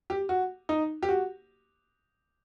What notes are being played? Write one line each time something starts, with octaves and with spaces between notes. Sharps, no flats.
G4
F#4
D#4
G4
F#4